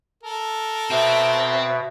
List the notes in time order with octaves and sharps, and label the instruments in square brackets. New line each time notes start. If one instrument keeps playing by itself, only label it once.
[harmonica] A4 A#4
[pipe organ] B2 [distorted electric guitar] C4 [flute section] C5 E5